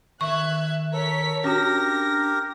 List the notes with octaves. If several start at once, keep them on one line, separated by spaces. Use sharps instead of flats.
D#3 E5 C#6 F#6 G#6
A4 A#4 C#5 B6
C#4 D4 F#4 G4 A#4 A#6